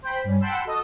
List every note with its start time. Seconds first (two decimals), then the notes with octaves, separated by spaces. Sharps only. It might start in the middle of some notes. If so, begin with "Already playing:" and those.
0.02 C5 G5 B5
0.24 G2 G3 C#4
0.41 F#5 G5 A5 B5 C6 E6
0.65 F#4 A4 D#5